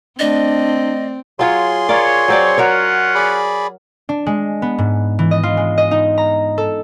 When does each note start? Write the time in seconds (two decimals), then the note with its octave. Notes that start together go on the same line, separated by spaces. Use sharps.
0.19 A3 C4 D4 D5 D#5 A6
1.39 F#3 F4 G#4 C#5 C6
1.89 F4 A#4 C#5 D5
2.28 F#3 C4 D5
2.58 C#4 F4 F#4 A#4 C#5 F#5
3.15 G#4 D5 B5
4.09 D4
4.26 G#3
4.62 B3
4.78 G#2
5.19 E3
5.31 D#5
5.43 F4
5.57 G#3
5.78 D#5
5.91 D#4
6.18 A#5
6.58 A4